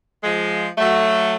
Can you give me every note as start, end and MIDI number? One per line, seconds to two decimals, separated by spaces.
0.23 0.67 53
0.23 0.67 56
0.78 1.36 54
0.78 1.36 57